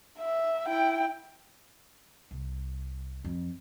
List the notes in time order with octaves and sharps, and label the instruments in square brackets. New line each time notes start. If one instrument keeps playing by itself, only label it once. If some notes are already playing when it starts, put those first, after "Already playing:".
[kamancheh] E5
E4 G5
[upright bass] C2
F2